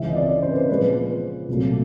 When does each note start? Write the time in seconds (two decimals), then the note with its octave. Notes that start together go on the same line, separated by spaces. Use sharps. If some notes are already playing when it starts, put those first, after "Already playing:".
Already playing: C#2 C#3 E3 E5
0.10 D#5
0.16 D5
0.42 C5
0.51 B4
0.58 C5
0.69 A#2 F3 G#3 B3 B4
1.48 C2 A#2 F#3 A3